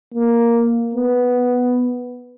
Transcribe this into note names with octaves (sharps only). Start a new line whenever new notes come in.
A#3
B3